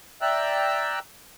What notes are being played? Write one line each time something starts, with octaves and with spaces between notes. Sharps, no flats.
D5 E5 G5 A#5 E6 F#6